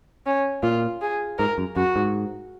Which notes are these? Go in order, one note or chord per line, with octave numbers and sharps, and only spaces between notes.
C#4
A#2 F4
G#4
G#2 A#4
F#2
F#2 F#4
G#2